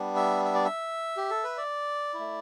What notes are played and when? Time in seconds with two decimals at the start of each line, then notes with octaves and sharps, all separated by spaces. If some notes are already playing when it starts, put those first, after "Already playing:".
Already playing: G3 B3 D4
0.16 E5
0.45 E5
0.54 D5
0.65 E5
1.17 G4
1.30 A4
1.44 B4
1.57 D5
2.14 E4
2.19 A3